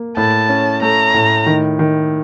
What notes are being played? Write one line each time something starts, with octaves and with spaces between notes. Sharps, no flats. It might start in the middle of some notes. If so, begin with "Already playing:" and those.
Already playing: A#3
A2 A5
C#4
A3 A#5
A2
D#3
D#3